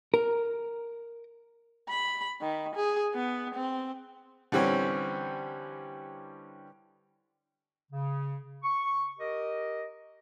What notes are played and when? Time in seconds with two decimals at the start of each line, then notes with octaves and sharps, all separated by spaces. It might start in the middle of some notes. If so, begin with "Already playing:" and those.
0.14 A#4
1.89 B5
2.41 D#3
2.75 G#4
3.14 B3
3.55 C4
4.52 D3 E3 G3 C4 C#4
7.92 C#3
8.64 C#6
9.19 G4 A#4 D#5